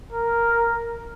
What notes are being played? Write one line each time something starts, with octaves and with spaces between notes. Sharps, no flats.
A#4